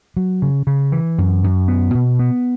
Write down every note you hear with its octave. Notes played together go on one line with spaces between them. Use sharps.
F#3
C#3
C#3
E3
F#2
F#2
B3
B2
B3